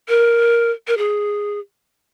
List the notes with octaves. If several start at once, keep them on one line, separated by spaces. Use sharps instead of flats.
A#4
A#4
G#4